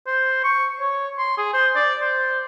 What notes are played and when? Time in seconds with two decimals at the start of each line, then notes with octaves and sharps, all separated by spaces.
0.07 C5
0.44 C#6
0.80 C#5
1.18 C6
1.37 G#4
1.53 C5
1.76 D5
2.01 C5